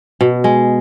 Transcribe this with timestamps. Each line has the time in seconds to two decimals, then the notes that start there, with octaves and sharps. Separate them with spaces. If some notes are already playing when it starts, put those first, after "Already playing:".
0.21 B2
0.44 G#3